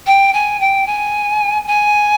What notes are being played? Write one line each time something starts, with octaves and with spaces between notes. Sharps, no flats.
G5
G#5
G5
G#5
G#5